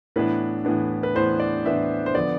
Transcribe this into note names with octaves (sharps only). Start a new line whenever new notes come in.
A2 E3 B3 D4 B4
A2 E3 B3 D4
B4
A2 E3 B3 D4 C5
D5
A2 E3 B3 D4 E5
C5
D3 F3 B3 D5